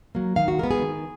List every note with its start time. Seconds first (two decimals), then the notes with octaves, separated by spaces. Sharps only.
0.15 F#3 A#3
0.36 D#3 F5
0.48 F#4
0.59 G#3 B3 A#4
0.71 G#4
0.82 D#3